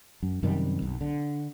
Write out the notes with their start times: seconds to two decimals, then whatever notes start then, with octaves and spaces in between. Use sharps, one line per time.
0.23 F#2
0.43 F#2 C3 D#3 G3
0.82 B1
1.01 D3